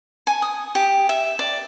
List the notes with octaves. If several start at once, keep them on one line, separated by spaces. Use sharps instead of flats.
G#5
D#6
G4
E5
D5